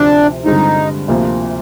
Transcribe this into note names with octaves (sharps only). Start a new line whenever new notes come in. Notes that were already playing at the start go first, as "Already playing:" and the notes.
Already playing: D2 C3 F3 D4
G2 D3 G#3 C4 D#4 F4
D2 C3 F3 A#3